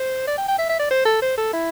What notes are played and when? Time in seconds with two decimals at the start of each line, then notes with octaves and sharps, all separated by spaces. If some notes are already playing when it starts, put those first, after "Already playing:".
Already playing: C5
0.27 D5
0.38 G5
0.48 G5
0.58 E5
0.69 E5
0.79 D5
0.91 C5
1.05 A4
1.22 C5
1.37 A4
1.53 E4